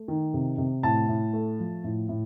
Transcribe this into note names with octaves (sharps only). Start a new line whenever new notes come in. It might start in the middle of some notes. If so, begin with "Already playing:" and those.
Already playing: A3
D#3
C3
C3
A2 A5
A2
A3
F3
A2
A2